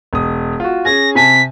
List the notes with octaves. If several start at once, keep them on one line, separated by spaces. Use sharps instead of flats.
E1 D#6
F4 F#4
C#4 G#4 G#5 A#6
C3 G#5 A5 B6